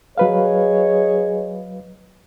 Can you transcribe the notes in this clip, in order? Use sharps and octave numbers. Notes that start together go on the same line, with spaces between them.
F#3 G#4 B4 C#5 D#5 F5